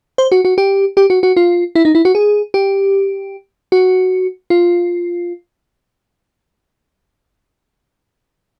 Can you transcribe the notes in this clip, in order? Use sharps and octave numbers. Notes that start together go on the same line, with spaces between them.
C5
F#4
F#4
G4
G4
F#4
F#4
F4
E4
D#4
E4
F#4
G#4
G4
F#4
F4